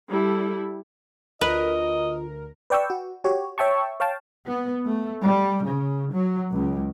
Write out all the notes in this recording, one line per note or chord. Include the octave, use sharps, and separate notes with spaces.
G3 E4 A4
D2 F4 A#4 B4 D#5
B4 D5 G5 C#6 E6
F#4
F#4 G4 C#5
C#5 E5 G5 A5 C#6
C#5 F5 G5 A5
B3
A3
G3
C#3
F#3
C#2